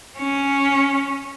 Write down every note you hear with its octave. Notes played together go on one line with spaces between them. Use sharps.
C#4